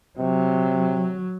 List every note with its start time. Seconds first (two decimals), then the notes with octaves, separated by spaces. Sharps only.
0.19 C3 F#3